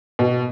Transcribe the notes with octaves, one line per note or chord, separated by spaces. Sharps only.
B2